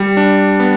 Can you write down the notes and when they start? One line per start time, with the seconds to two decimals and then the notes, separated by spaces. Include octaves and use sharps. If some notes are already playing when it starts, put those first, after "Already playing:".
Already playing: G3
0.17 D4
0.60 B3